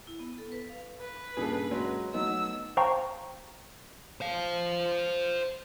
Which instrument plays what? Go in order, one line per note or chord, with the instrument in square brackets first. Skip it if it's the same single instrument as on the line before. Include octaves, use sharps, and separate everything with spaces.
[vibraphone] E4
B3
A4
B4
F5
[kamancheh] B4
[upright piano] G2 A#2 C#3 [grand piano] G#4 A4
[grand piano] F#3 G#3
[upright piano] F#3 A3 D#4 [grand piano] B3 [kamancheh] E6
[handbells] C5 F5 G5 A5 A#5 C#6
[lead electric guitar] C5 F5